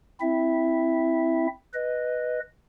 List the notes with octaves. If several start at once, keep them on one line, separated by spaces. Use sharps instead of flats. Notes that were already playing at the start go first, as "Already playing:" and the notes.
C4 E4 E5
B4 D#5